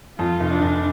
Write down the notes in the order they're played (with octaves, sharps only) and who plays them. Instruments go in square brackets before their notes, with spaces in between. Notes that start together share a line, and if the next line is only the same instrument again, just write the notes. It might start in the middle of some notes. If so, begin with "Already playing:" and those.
[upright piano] F2 [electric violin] F4
[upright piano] F1
[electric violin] D4
[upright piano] F1